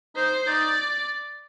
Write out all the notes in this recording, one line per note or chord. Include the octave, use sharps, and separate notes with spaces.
D#4 C5
D#4 D5